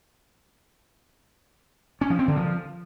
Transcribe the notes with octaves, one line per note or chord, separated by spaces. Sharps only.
C#4
F3
C4
D3
F3